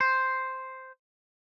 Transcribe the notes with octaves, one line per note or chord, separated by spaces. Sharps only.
C5